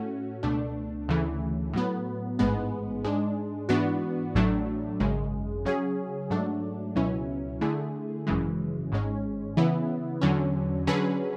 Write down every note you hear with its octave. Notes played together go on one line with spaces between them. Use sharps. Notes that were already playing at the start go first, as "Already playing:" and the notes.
Already playing: A2 A3 C#4 F#4
C#2 B2 A3 D4
D2 C#3 E3 A3
A2 F#3 B3
A1 G#2 G#3 B3
G#2 G#3 D4
G#2 E3 B3 D4 F#4
A1 A2 F#3 A3 D4
G#1 F#2 C#3 G#3
C#3 F#3 C#4 G#4
G#2 F#3 A3 D4
C#2 B2 F#3 C#4 E4
D3 A3 E4 G#4
G#1 F#2 C#3 E3 G#3
G#1 G#2 G#3 C#4
C#3 E3 B3 E4
E2 D3 F#3 C#4
D3 F#3 C#4 G#4 B4